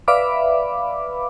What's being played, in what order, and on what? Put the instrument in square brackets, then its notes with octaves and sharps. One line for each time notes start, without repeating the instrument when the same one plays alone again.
[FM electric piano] B4 D5 E5 F5 B5 D6